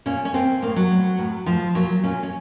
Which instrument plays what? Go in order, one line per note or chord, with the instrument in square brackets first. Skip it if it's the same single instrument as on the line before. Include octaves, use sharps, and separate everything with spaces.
[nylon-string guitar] A#2 C#4
C#4
A#2 C4
A2 A#3
F#3
A2
A2
A2 F3
A#2 F#3
A#2 C#4
C#4